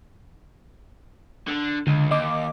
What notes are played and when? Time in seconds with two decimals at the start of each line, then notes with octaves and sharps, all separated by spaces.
1.48 D3
1.87 C#2 D3
2.11 D#2 D#5 D6